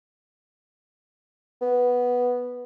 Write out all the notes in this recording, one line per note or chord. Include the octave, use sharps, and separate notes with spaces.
B3